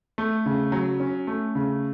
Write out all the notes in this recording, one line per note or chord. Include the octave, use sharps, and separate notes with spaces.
A3
C#3
F#3
C#4
A3
C#3